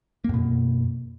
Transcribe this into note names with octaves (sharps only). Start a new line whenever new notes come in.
F#2 B2 A#3